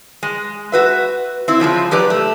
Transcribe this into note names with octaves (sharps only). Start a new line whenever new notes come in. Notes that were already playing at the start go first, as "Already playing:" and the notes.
G#3
F#4 B4 E5
C4 E4
C#3 F3 G3 G#3
F#3 G4 B4 D5
A3